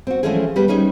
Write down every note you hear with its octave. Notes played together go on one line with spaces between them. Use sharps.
C4 F#4
E3 F3 G#3 A3 C#4 G#4
G3 B3 G4 B4
G3 C#4 D#4 G#4